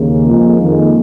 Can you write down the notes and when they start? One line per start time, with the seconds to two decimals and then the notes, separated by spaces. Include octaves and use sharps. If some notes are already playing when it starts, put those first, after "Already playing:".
Already playing: D#2 C#3 G#3 A#3
0.26 F2 F3 G#3
0.60 F2 D#3 G#3 A#3